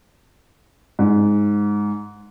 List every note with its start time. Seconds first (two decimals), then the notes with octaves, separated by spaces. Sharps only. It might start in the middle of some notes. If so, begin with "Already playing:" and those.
0.99 G#2